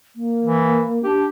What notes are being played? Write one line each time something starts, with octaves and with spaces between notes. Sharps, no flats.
A#3
E3
D4 G4